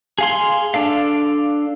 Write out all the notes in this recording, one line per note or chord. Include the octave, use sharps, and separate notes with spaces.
G#4 F5 C6
D4 A4 F5